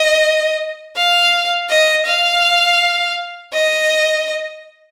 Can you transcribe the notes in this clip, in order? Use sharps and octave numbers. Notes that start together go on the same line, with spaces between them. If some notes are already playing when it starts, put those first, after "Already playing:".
Already playing: D#5
F5
D#5
F5
D#5